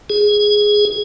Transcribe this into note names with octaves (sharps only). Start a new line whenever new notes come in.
G#4